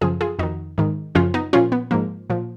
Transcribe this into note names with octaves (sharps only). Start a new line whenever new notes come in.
F#2 C#3 F3 F4 G#4
F4 G#4
F2 D#3 D#4 F#4
G#2 D#3
F#2 C#3 F3 C#4 F4
B3 D#4
A#2 F3 C#4 F4
B3
G#2 F3 A#3
A#2 F3